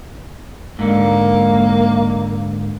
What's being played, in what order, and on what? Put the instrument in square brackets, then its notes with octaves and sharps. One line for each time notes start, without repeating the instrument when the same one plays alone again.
[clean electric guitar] G#2 D3 [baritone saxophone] A#3